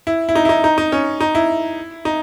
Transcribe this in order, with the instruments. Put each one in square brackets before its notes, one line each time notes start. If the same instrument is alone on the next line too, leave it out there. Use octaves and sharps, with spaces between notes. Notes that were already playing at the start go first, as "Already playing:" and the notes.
[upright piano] E4
E4
D#4
E4
D#4
D#4
D#4
C#4
D#4
E4
D#4